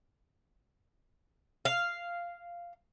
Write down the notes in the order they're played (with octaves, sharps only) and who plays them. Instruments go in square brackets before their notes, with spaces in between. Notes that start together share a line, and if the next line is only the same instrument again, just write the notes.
[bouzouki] F5